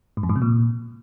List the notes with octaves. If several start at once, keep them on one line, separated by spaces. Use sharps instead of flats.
G#2
F2
G#2
C3
A#2